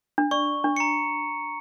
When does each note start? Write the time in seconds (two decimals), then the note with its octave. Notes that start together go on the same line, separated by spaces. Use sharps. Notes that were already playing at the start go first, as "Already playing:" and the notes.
0.18 D4
0.31 D5 C#6
0.64 D4
0.77 A#5 C#7